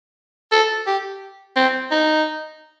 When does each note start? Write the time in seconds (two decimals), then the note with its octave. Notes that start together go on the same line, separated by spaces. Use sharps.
0.52 A4
0.87 G4
1.56 C4
1.91 D#4